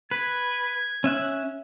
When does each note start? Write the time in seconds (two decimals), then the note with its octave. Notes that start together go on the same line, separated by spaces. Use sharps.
0.11 B4 G#6
1.04 C#4 E5 F#6